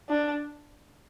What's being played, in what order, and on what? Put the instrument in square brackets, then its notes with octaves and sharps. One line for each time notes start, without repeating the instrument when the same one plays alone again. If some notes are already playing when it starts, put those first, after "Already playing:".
[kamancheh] D4